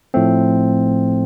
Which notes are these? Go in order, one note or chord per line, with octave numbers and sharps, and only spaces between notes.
A2 F3 A3 C4